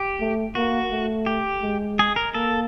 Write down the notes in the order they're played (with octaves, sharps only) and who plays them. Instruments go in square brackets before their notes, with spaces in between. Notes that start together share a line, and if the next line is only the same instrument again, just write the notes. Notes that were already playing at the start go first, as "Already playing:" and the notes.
Already playing: [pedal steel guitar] G4
[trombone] A3
[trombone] A#3 [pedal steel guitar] F#4
[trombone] A3
[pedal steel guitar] G4
[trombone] G#3
[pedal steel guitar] G#4
A#4
[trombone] A#3 [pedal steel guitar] A4